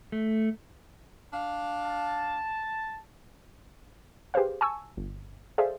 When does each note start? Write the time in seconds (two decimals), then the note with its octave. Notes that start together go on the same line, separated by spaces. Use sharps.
0.12 A3
1.33 D4 F5
1.84 A5
4.34 G4 G#4 B4 C5 F5
4.61 G#5 A5 C#6 E6
4.97 G1
5.58 G#4 A4 C5 D5 E5 F5